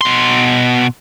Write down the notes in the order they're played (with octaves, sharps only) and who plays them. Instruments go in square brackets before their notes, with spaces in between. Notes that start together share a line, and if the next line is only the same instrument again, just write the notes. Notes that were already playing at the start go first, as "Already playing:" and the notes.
[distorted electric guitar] B2 C6